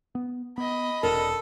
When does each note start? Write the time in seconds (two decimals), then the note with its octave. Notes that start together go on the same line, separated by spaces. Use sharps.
0.15 B3
0.58 B3 D#5 B5
1.03 E1 C3 D4 A4 A#4